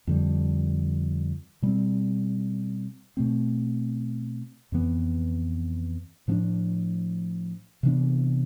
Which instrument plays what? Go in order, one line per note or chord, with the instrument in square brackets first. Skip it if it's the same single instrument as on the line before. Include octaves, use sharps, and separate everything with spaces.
[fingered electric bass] F2 D3 G3
B2 G3 C4
B2 A3 C4
F2 E3 B3
A2 F3 B3 D4
C3 E3 B3 D4